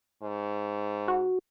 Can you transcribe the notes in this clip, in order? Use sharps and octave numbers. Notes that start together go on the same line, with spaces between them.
G#2
F#4